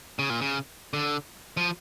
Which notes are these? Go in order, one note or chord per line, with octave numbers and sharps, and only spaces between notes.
C#3
A#2
C#3
D3
F3